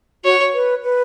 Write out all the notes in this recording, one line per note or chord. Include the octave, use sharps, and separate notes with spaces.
F#4 C#5
B4
B4